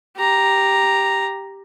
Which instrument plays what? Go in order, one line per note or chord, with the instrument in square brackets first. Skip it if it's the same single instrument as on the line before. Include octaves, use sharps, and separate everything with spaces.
[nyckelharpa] G4 A#5